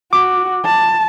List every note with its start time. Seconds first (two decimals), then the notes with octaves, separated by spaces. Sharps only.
0.13 F#4 D6
0.65 A5